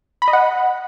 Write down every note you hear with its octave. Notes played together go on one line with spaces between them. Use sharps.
B5
D#5
F#5